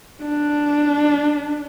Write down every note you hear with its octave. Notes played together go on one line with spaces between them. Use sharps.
D4